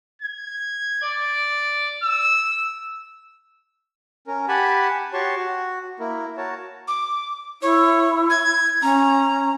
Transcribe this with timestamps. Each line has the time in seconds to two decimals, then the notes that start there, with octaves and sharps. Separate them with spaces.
0.22 G#6
1.02 D5
2.03 E6
4.27 C#4 A#4
4.48 G4 F#5 G#5 A5 B5
5.13 F#4 G4 C#5 A5 C6 C#6
5.35 F#4
5.99 A#3 E4 A#4
6.37 F#4 A#4 C#5 A5
6.88 D6
7.62 E4 C#5
8.30 G#6
8.82 C#4 A#5